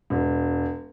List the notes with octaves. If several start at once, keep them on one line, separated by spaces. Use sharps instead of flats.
E1